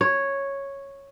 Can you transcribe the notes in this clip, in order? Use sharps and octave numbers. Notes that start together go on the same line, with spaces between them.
C#5